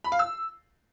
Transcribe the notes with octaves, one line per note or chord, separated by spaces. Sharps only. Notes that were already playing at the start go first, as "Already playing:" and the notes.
B5
F5
E6